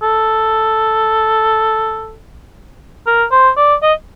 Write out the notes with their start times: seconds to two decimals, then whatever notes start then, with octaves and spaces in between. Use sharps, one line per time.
0.02 A4
3.07 A#4
3.32 C5
3.57 D5
3.82 D#5